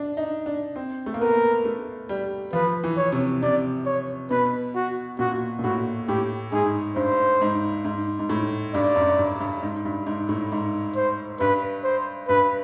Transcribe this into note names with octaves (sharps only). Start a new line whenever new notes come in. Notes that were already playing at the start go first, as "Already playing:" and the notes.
Already playing: D4
D#4
D4
C4
A3
A#3
B3 A#4
A3
G3
F3 B4
E3
C#5
C3
C3 D5
C#5
B2 B4
F#4
A#2 F#4
A#2
A2 F#4
A2 G4
G#2 G#4
G2 C5
G#2
G#2
G#2
A2
G2 D5
F#2
G2
G2
G#2
G2
G#2
A2
G#2
C5
G2 B4
C5
G2 B4